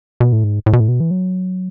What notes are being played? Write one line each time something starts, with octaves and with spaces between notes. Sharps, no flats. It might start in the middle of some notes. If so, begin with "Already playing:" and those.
B2
A2
G#2
A2
B2
A2
B2
E3
F#3